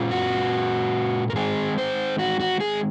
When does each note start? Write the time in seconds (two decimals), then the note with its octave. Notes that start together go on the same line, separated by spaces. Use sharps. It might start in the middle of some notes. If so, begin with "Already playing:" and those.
Already playing: A#2 G#3 C#4 F4
0.11 F#4
1.30 A#4
1.35 D#3 G#3 C4 D#4 G#4
1.78 C5
2.19 F#4
2.40 F#4
2.60 G#4